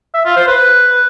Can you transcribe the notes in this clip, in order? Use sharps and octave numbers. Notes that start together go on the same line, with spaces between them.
E5
F4
C5
B4